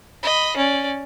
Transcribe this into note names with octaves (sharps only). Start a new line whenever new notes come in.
D#5 B5
C#4 D5